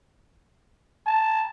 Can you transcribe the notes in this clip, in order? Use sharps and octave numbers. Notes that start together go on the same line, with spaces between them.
A5